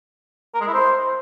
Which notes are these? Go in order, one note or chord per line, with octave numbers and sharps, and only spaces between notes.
A#4
G#3
E4
C5